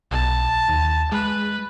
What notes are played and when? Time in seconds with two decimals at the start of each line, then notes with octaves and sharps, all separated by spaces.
0.11 B1 A5
0.69 D#2
1.12 G#3 B4